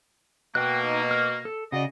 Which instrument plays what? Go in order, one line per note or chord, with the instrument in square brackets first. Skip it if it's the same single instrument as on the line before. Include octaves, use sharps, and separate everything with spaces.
[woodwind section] B2 A#3 [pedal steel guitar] G5 F#6
[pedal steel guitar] D#4
F6
A4
[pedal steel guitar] C#3 [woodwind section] F#4 D5 D#5